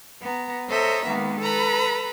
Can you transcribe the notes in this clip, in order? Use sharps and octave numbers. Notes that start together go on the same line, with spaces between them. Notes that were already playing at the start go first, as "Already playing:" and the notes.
B3 A#5
A4 C5 C#5 D#5 E5 A#5
D#3 G#3 A#3 B3
A4 B4 A#5 B5